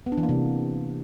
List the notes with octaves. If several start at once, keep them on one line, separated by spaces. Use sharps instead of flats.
B3
D4
E3
A#3
C3